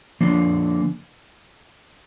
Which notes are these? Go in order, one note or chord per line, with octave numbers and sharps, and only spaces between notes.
D3 F3 A#3